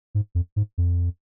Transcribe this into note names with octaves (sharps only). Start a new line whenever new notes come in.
G#2
F2
G#2
F2